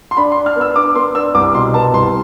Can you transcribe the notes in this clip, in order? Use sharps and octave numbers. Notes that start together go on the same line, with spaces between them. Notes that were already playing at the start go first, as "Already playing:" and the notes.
C6
D4 B5
C6
D4
F6
B3
E6
D4 D6
B3 C6
D4 E6
C2 D6
B2 C6
B3 A5
C2 C6